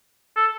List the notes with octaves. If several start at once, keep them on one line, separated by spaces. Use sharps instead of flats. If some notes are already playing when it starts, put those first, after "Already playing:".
A4